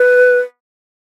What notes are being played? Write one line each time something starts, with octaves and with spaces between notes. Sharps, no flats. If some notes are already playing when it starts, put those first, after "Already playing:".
Already playing: B4